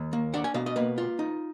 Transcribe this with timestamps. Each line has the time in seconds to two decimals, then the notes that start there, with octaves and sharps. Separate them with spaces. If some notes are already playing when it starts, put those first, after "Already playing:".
Already playing: D#2
0.13 A#3
0.34 D4 F#5
0.44 G#5
0.54 B2 F5
0.66 D#5
0.76 A#3 B4
0.98 F4
1.19 D#4